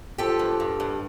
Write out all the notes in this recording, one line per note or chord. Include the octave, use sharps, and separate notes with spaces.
F3 G4 A4
G2
G2
G2